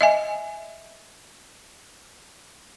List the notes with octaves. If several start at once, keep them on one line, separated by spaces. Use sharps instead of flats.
D#5 E5 G#5